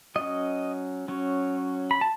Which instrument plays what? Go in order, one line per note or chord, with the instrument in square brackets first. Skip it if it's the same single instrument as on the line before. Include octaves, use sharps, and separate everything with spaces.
[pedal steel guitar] F#3 C#4 D#5
F#3 C#4
B5
A5